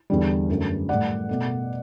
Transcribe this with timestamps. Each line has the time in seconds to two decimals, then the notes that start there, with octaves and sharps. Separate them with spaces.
0.10 E2 D3 G3
0.50 F#2 D3 F#3 A3
0.89 A2 G3 D5 F#5
1.29 B2 A3